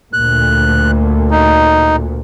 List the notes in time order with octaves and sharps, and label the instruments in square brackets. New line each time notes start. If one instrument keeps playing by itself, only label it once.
[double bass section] D2 A#2 [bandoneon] F#6
[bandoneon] D#4